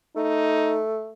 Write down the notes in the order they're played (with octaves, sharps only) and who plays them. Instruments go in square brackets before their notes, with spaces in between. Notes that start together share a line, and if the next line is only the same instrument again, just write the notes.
[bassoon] A3 [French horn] D#4